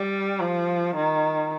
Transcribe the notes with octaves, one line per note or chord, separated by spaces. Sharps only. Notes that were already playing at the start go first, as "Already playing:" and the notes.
Already playing: G3
F3
D#3